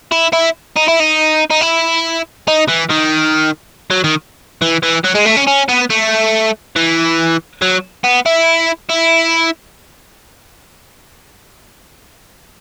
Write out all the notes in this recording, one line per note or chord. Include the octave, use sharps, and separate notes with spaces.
E4
E4
D#4
E4
D#4
D#4
E4
D#4
E3
D#3
F#3
D#3
E3
E3
F#3
G#3
A3
C#4
C#4
B3
A3
E3
F#3
B3
E4
E4